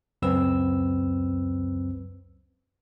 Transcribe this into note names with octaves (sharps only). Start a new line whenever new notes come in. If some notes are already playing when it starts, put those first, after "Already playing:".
C#2 F#2 C4 B4 E6